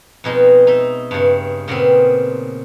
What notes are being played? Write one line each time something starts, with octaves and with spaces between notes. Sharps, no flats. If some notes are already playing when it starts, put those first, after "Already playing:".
F2 B2 G#3 D#4
D#4 E5
G2 C#3
A#2 C#3 B3 C4